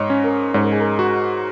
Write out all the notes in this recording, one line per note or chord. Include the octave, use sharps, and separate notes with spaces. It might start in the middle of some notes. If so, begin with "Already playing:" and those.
Already playing: G#2 C#5 D#5
C#4
A#4
G#2 C#5
A#4
G#4
A#4
F#4